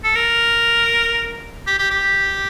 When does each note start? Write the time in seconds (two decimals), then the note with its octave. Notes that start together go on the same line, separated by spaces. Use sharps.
0.04 A4
0.15 A#4
1.67 G4
1.79 G4
1.90 G4